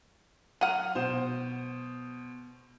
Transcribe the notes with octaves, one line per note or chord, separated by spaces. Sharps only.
F#3 F#5 F6 D#7
B2 C5 E7